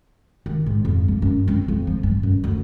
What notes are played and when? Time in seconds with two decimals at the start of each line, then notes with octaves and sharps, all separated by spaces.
0.46 D#3
0.66 G#2
0.85 F2
1.08 A#3
1.22 F#2
1.48 C4
1.68 F2
1.87 F3
2.03 G2
2.23 F#2
2.44 D2